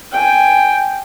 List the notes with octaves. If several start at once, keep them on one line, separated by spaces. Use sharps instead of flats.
G5 G#5